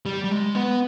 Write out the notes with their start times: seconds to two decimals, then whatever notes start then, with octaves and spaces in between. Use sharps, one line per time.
0.06 G3
0.24 G3
0.31 G#3
0.55 B3